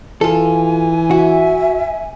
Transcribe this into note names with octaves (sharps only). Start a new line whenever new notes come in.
E3 F4 A4 G#5
F#4 E5